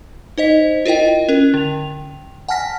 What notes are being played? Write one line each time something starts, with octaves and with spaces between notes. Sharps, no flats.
D#4 C5 D#5 B6
E4 F4 A#4 D#5 G5
C#4 A#4
D3 F7
F#5 G#5 A5 F6 A#6 B6